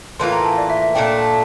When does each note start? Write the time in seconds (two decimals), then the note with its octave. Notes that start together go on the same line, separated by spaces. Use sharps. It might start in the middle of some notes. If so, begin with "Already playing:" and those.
0.19 A2 E3 A#3 F4 C6
0.32 A#5
0.45 A5
0.58 D5
0.70 E5
0.82 E5
0.95 A#2 A3 D4 G5